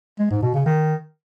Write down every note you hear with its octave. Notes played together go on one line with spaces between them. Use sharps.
G#3
G#2
B2
C#3
D#3